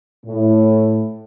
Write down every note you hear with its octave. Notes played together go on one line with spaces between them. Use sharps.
A2